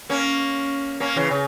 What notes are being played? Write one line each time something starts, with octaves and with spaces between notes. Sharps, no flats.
A#3 C#4
A#3 C#4
C#3 E3
C#3